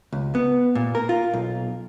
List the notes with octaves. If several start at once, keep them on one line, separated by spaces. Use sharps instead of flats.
C#2
B3
A#2
A#4
F4
B1